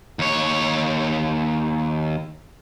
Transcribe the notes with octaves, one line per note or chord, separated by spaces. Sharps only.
D#2 C#5